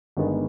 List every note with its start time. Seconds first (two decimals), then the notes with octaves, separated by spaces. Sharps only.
0.17 G1 G2 D#3 G#3 B3